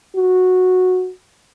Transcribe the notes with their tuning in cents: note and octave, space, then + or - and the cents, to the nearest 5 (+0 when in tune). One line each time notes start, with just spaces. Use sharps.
F#4 -10